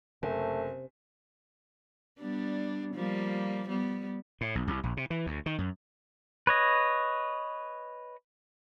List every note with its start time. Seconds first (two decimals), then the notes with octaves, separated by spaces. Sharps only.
0.23 F#1 C3 A3
2.19 G3 B3 D4
2.95 F3 G3 A#3
3.68 G3 B3
4.41 A2
4.55 B1
4.67 C2
4.83 A#1
4.97 C3
5.10 E3
5.26 D2
5.46 D#3
5.58 F#2
6.47 B4 C#5 D#5